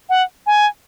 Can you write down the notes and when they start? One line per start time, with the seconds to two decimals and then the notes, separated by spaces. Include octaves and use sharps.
0.09 F#5
0.47 G#5